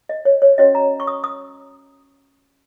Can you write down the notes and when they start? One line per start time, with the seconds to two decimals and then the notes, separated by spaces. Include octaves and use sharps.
0.09 D#5
0.25 C#5
0.42 C#5
0.58 C#4 F#4 C#5 D#5
0.75 A#5
1.00 C#6
1.07 D#6
1.24 D#6